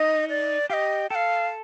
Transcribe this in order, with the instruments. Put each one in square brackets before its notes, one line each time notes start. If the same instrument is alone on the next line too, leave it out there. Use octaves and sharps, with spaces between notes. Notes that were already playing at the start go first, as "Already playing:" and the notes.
Already playing: [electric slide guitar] D#4 [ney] D#5
[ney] D5
[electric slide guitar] G4 [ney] F5
[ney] D#5
[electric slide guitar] A4 [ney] F5 G5